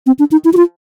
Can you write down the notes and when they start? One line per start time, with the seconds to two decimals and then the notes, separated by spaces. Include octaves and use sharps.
0.07 C4
0.19 D4
0.32 D#4
0.45 E4
0.53 F#4
0.57 F4